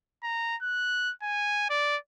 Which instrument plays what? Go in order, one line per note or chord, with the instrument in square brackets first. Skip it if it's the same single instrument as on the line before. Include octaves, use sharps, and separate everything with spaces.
[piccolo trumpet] A#5
F#6
G#5
D5